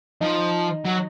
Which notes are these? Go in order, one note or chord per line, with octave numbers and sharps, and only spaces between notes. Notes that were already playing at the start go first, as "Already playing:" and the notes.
F3 D#4
F#3